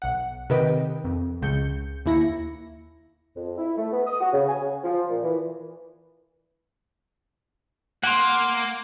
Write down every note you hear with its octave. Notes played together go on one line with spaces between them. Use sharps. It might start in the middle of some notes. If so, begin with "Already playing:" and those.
B1 F#5
C3 D#3 B4 D#5 G5
F2
C#2 C#3 G6 C#7
D#2 E4 A#6 C#7
F2
E4
A3
B3
D#6
F#4
C#3
G#5
C#3
F3
A#2
E3
A#3 F#5 C6